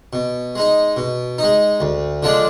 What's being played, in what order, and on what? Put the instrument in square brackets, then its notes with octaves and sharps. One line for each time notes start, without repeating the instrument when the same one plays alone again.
[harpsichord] B2
G#3 D#4
B2
G#3 D#4
D2
D3 F3 G#3 D4